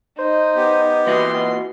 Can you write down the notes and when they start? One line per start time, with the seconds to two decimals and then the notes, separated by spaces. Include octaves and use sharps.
0.19 D#4 C5
0.56 B3 G4
1.06 A#2 E3 F#4 D#5 C6